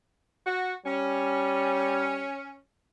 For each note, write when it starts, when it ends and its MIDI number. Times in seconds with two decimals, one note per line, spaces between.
0.46 0.74 66
0.85 2.30 55
0.85 2.57 61